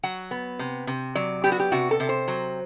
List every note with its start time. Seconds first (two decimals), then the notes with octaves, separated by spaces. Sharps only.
0.03 F#3 F#5
0.31 B3
0.59 C3
0.87 C3
1.15 F#3 D5
1.44 B3 G4
1.52 F#4
1.60 G4
1.72 C3 F#4
1.91 A4
2.00 C3
2.09 C5
2.28 F#3